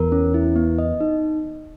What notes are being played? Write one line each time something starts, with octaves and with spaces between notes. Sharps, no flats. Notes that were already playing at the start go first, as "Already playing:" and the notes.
Already playing: E2 A#4
C#4
E4
B3
D#5
D#4